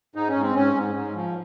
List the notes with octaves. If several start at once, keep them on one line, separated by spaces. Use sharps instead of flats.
G#2 D#4
C#4
G#2
C4
G#2 C#4
G#2
G#2
F3